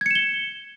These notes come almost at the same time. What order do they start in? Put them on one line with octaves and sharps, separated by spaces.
G#6 C#7 E7 G7